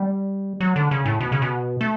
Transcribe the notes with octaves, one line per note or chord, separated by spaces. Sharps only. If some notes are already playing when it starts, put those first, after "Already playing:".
Already playing: G3
F#3
D3
C#3
A2
B2
C#3
B2
A3